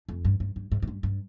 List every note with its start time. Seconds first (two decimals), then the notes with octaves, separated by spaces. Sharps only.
0.09 F2
0.25 G2
0.40 G2
0.56 G2
0.72 G#2
0.83 G#2
0.88 G2
1.03 G2